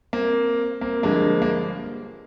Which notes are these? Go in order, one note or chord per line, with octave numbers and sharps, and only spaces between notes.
A#3 C4
A#3 C4
G2 D3 F3 G#3 A#3
A#3